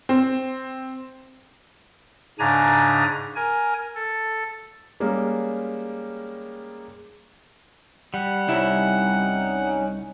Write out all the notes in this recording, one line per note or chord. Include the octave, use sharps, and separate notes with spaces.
C4
G#2 C#3 D4 G#5 A#5
A#4 G#5
A4
G3 G#3 A#3 C#4
G3 F#5
C2 C#4 D#4 E4